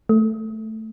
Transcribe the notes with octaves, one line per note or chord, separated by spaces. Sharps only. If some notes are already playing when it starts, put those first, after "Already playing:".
A3